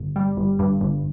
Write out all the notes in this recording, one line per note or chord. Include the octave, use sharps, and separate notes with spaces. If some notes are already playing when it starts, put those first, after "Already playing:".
Already playing: G1
G3
G1
G2
G1